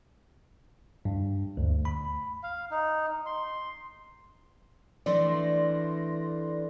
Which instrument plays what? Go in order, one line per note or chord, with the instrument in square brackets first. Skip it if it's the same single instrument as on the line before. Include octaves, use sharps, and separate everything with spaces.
[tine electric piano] G2
D2
B5
[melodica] F5
D#4
C6
[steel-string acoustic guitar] E3 A3 D4 [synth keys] D5 C6 A#6